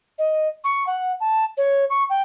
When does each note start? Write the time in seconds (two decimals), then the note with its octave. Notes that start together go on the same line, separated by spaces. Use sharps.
0.19 D#5
0.64 C#6
0.87 F#5
1.20 A5
1.57 C#5
1.90 C#6
2.10 G5